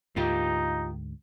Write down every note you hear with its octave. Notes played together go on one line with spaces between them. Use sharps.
D2 G#2 A#3 D#4 F4 G4